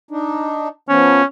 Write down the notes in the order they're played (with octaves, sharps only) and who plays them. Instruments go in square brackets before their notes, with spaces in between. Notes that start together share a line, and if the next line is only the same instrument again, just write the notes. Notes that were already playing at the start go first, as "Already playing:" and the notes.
[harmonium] D4 D#4
[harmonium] F3 B3 [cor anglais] C#4